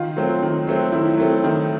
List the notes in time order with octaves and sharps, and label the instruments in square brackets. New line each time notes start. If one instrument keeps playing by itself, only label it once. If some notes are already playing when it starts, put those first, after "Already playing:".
Already playing: [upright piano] D#3 [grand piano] F4
[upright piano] F#3 A3 C4
D#3
F#3 A3 C4
[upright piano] D#3 [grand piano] E4
[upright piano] F#3 A3 C4
D#3